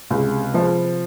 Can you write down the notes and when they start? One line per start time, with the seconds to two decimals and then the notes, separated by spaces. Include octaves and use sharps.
0.11 C#2 C3
0.54 F3